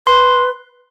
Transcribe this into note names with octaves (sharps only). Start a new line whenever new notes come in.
B4 C6